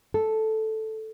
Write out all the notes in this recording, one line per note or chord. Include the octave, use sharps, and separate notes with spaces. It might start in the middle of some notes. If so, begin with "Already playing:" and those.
A4